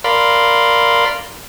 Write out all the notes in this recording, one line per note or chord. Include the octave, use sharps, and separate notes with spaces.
A#4 D5 F5 B5 C6